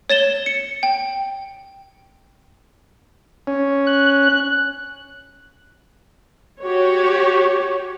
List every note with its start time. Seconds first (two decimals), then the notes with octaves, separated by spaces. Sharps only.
0.10 C#5 A6 E7 G7
0.46 C#7
0.83 G5
3.47 C#4
3.86 F#6
6.63 F#4 G4 C#5